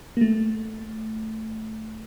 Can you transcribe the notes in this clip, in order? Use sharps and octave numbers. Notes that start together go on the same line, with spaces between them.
A#3
A3